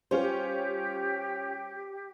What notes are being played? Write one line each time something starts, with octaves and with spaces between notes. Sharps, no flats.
G3 C#4 F4 G4 C5